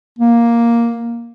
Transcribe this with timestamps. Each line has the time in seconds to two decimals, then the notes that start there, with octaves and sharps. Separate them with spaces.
0.19 A#3